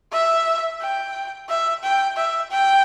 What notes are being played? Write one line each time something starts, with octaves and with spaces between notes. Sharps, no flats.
E5
G5
E5
G5
E5
G5